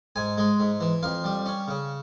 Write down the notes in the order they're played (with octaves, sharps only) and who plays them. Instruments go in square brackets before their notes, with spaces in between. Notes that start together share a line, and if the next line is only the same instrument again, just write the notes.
[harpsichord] G#2 G#5
G#3
G#2
E3
F2 F5
G3
C#4
C#3